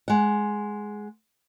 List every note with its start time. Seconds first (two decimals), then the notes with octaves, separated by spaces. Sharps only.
0.08 G#3 F#5